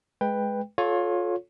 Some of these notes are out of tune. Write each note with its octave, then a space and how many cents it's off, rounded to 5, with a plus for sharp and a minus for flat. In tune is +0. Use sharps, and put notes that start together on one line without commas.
G#3 +10 B4 +0 G5 +10
F4 +20 A4 -25 C#5 +0